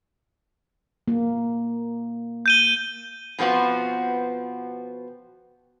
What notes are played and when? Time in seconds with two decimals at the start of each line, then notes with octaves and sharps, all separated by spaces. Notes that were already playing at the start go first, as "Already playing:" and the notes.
1.08 A#3
2.46 G6 D#7 G7
3.38 B2 F3 B3 C4 F#4